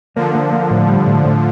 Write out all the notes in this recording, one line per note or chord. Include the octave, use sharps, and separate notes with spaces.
D3 F3 A#3
A#3
A#3
A2
G3
A2
A2